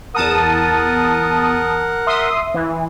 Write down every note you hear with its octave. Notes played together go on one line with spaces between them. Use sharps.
E2 A#4 F#5 A5 D#6
E5 C6 D#6
E3